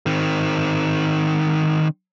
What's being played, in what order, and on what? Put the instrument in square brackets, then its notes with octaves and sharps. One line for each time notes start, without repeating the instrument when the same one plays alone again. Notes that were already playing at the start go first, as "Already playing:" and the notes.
[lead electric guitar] D#3 C4